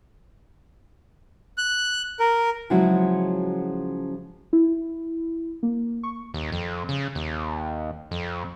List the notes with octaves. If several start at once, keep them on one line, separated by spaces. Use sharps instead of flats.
F#6
A#4
C#3 F3 F#3 G#3 E4 F#4
E4
A#3
C#6
D#2
F2
C#3
D#2
F2